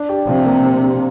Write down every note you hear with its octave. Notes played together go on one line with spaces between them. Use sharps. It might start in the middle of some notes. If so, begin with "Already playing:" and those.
Already playing: D4
G4
C3 F3
A#3
D4
G4